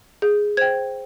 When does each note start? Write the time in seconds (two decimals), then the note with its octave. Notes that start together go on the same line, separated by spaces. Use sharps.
0.22 G#4 G6
0.57 C5 G5 G#6